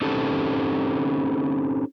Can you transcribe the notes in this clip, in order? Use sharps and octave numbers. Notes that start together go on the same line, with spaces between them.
C4 C#4 D#4 G4 A4